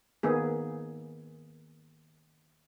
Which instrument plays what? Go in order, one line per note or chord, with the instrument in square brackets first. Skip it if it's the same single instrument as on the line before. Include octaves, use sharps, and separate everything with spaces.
[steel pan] D#3 A#3 B3 G#4